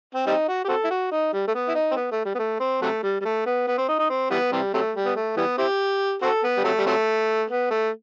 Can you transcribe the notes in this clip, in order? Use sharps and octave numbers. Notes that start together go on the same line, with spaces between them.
C4
G3 C4 D#4
F#4
G4
C4 F#4 A4
E4
F#4
D#4
G3
A3
B3
E4
D#4
C4
B3
A3
G3
B3
A3
C4
C3 F#3 A3
G3
G3
A3
B3
B3
C4
D#4
D#4
C4
E3 G3 B3
C3 E3 G3
C3 F#3 A3
G3
B3
A3
E3 G3 B3
C4 E4 G4
C4 F#4 A4
B3
G3
C3 F#3 A3
G3
C3 F#3 A3
B3
A3